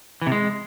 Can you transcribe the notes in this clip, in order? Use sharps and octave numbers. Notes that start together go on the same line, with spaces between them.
E3
C3
G#3